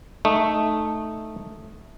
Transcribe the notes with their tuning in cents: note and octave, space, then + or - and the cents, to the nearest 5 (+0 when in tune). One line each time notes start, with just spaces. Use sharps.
A3 -5 D#4 -5